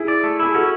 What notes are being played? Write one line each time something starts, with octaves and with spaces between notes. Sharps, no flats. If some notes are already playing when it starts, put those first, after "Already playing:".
Already playing: E4 G#4
D5
A3
E4 G#4
C#4 F#4 A4